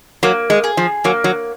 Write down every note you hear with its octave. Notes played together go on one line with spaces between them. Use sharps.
F#3 A#3
G#3
G#4
F3
F#3 A#3
F#3